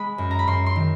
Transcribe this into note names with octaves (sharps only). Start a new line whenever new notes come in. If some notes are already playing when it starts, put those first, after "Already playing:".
Already playing: G#3 B5
F#2
A#5
B5
F#2 C6
C6
D#3